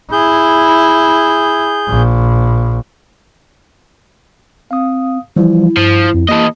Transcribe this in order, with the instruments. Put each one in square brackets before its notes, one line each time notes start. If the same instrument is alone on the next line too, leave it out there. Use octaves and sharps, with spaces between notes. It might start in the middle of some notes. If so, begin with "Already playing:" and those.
[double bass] E4 [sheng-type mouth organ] G#4 G6
[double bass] A#1
[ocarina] C4 [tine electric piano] F5 D#6
[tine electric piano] E3 F3 G3 [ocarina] E4
[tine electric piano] G2 [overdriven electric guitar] F3
[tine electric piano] F2 F3
[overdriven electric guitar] E3 D#5 [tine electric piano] A#3 G4 A5